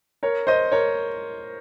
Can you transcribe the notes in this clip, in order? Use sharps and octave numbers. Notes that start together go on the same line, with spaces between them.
A#4 C#5
C5 D#5
A#4 C#5